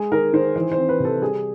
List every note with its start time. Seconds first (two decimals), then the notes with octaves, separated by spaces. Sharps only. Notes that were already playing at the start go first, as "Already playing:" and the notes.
Already playing: G#3 G#4
0.12 D#3 A#4
0.33 D#3 C5
0.56 E3 C5
0.72 C5
0.78 C4
0.89 B4
1.00 C3 A4
1.22 G3 G#4